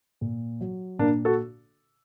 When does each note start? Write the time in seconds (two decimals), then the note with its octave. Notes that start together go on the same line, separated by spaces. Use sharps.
0.21 A#2
0.61 F#3
0.99 A#2 A#3 D4
1.25 F#4 A4